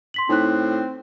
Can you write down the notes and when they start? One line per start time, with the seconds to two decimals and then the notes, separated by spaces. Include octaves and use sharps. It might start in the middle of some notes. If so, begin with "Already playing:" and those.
0.14 C6 B6 F#7
0.29 A2 C4 D#4 F#6